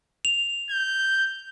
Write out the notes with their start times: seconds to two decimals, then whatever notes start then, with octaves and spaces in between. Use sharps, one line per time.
0.25 F7
0.70 G6